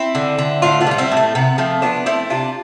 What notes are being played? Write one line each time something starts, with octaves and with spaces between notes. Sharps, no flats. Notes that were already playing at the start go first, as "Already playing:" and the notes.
Already playing: C4 E4
D3
D3
A2 D4 F4
B3 D4
G3 F4
C4 E4
A2
A3
C3 B3
F3 A3 C4
F3 B3 D4
A3 C4 E4
C3 D4 F4